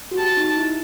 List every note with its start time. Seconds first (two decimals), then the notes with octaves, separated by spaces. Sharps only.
0.11 F#4
0.18 G4 A5
0.37 D#4
0.57 E4